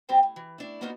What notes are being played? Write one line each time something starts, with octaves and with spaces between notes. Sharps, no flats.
G3 C4 G4 A4 C5 G5
A2
E3
A3 D4 E4
A#3 B3 D4 D#4 F4 F#4